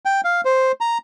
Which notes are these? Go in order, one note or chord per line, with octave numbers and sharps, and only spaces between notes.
G5
F5
C5
A#5